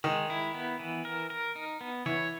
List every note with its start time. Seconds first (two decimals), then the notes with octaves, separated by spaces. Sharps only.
0.04 D#3 G#3
0.30 E4
0.54 B3
0.79 E3
1.05 A#4
1.30 A#4
1.56 D#4
1.81 B3
2.06 E3 C#5